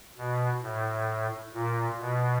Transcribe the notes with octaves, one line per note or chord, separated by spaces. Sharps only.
B2
A2
A#2
B2